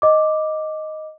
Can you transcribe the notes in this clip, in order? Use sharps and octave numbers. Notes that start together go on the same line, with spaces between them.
D#5 D6